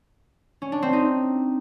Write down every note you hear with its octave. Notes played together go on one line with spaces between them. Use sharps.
C#4
D4
C4
D#4